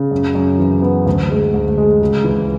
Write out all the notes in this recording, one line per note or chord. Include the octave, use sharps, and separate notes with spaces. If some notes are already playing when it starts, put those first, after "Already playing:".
Already playing: C#3
F#2
F#2
E3
B3
D2
G#3
D2
G#3
C#2
E3